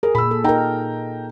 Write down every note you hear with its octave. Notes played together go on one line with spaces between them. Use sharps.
G#4 A#4
A#2 B5 E6
A4
D#4 A#4 G5 A#5